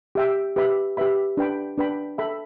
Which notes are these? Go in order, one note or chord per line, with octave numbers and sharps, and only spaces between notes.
G4 E5 G5
G4 B4 E5 B5
G4 B4 E5 B5
D4 B4 G5 B5
D4 B4 G5 B5
A4 E5 G5 B5